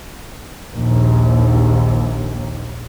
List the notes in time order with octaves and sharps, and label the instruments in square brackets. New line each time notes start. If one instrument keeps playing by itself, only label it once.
[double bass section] A#1 D#2